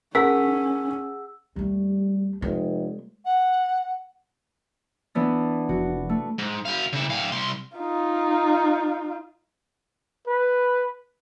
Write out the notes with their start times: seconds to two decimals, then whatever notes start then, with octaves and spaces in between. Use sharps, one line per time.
0.15 C#4 G#4 A#4 F#5 A5 E6 B6
1.56 D#2 G3 A3
2.42 F1 G#3
3.25 F#5
5.15 E3 B3 D4
5.69 F1 F#4
6.09 A3
6.39 G#2
6.66 F#2 F5
6.93 C#3 E4
7.09 A2 F5
7.32 C2 C6
7.77 D#4 F4
10.27 B4